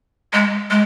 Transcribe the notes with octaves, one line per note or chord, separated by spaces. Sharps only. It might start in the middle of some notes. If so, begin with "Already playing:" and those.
G#3
G#3